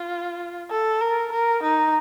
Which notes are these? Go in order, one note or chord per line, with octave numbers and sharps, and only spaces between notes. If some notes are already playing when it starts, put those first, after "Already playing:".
Already playing: F4
A4
A#4
A#4
D#4